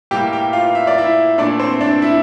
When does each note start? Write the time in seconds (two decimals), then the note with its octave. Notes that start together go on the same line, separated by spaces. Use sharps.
0.11 A2 G3 A#3 E4 G4 G5
0.33 G4 G5
0.53 F4 F5
0.75 E5
0.87 D5
0.98 E4 E5
1.38 A#2 A3 D4 E4 D5
1.59 C4 C5
1.81 D4 D5
2.02 E4 E5